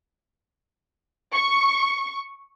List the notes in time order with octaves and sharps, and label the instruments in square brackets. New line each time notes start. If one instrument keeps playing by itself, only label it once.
[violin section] C#6